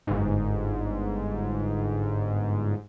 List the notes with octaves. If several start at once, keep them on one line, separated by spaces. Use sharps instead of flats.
G1 G#2